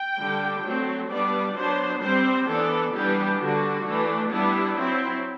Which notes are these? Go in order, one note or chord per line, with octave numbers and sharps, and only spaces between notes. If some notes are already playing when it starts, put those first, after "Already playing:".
Already playing: G5
D3 G3 D4
F#3 A3 C4
G3 B3 D4 D5
F#3 B3 D4 C5
G3 C4 C5
E3 B3 D4 A4
E3 G3 B3 D4 G4
D3 G3 D4 F#4
E3 A3 D4
G3 B3 D4 E4
F#3 C4 E4